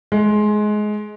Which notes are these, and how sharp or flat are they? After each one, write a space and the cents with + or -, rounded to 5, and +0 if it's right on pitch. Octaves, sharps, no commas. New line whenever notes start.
G#3 +20